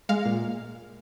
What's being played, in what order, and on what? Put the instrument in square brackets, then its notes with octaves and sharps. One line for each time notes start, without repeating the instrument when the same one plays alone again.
[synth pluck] G#3 F5
A#2